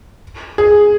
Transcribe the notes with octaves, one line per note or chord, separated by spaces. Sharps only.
G#4